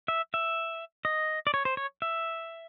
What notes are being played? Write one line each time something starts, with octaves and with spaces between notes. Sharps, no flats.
E5
E5
D#5
D5
C#5
C5
C#5
E5